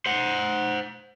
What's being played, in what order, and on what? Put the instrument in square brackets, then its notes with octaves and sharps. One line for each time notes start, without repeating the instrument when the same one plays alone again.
[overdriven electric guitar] C5 F#5